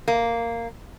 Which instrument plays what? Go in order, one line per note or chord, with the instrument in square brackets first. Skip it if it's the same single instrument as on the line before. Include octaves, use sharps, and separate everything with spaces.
[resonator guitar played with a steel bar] A#3